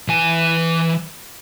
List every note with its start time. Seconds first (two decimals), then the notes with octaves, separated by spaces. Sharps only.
0.08 E3 G#5